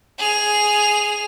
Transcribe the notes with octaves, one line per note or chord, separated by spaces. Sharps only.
G#4 F7